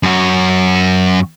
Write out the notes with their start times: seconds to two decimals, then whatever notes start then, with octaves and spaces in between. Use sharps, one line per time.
0.03 F#2 F#4